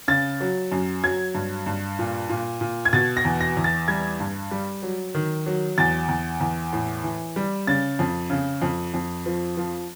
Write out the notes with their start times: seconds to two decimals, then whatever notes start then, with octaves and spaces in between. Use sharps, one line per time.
0.08 C#3 A6
0.40 F#3
0.71 F#2
1.03 F#3 G#6
1.35 G2
1.66 G2
1.99 A#2
2.29 A#2
2.61 A#2
2.85 G#6
2.93 B2 A6
3.17 A#6
3.25 E2
3.41 A#6
3.57 E2
3.64 A6
3.88 G3 G#6
4.20 G2
4.51 G3
4.82 F#3
5.14 D#3
5.46 F#3
5.78 E2 A6
6.09 E2
6.40 E2
6.73 A2
7.04 E3
7.36 G3
7.67 C#3 A6
7.99 F2
8.30 C#3
8.62 F2
8.94 F2
9.26 F3
9.57 F3